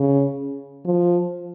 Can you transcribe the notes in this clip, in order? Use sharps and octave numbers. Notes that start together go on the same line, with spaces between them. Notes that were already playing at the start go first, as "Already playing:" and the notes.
Already playing: C#3
F3